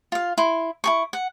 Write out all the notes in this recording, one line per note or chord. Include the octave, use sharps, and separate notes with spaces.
F4 F5
E4 C6
E4 G#4 C#6
F#5